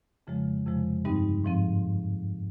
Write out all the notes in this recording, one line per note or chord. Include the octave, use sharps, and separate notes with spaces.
F2 C#3 F3 G#3
F2 C3 F3 G#3
G2 G3 C4 D#4
G#2 F3 C4